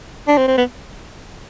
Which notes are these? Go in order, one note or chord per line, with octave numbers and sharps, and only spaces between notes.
D4
C4
C4
B3